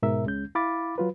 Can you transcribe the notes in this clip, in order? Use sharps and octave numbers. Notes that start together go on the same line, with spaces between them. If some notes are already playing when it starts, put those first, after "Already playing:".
G#2 B2 A#4 E5
C#2 G#3 C#4 G6
E4 F5 B5 D6 A6
F#3 F4 B4